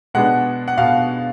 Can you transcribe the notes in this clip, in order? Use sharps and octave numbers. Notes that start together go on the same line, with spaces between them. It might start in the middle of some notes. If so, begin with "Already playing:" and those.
B2 G#3 B3 D4 F#5
F#5
B2 F5